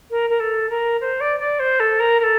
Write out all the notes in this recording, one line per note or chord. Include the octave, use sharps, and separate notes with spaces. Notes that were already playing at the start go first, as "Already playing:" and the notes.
A#4
A#4
A4
A#4
C5
D5
D5
C5
A4
A#4
A#4
A4